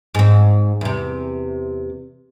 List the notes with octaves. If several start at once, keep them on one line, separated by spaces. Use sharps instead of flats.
G#2 C4
E2 C3